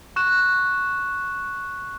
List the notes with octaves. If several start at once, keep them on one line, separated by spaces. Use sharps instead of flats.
C#6 F#6 E7